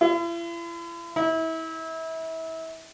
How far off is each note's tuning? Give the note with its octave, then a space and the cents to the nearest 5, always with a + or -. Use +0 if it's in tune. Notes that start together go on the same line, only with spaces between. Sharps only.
E4 +45
E4 -30